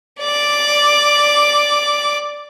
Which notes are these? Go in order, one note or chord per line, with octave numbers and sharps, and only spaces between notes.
D5 D6